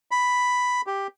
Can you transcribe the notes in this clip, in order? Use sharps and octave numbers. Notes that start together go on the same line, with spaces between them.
B5
G4